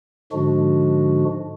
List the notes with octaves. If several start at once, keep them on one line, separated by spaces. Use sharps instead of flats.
G#2 D3 F3 G#3 D4 F#4